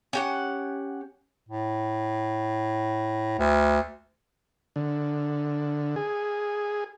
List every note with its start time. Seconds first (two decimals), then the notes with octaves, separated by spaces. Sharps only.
0.13 C#4 G4 F#5
1.49 A2
3.39 D2
4.76 D3
5.96 G#4